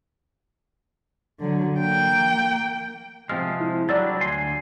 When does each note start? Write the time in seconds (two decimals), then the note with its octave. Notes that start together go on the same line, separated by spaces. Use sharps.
1.40 D3 F#3
1.78 A#3 G5
3.29 C3 F3 G#3 C4 F6
3.61 E4
3.89 F#3 G3 D4 D5 E6 A6
4.21 D2 G#5 C6